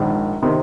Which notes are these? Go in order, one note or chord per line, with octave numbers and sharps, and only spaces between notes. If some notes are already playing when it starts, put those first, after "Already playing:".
Already playing: A#1 G#2 D#3
C3 D#3